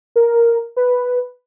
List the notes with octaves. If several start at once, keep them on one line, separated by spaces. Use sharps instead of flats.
A#4
B4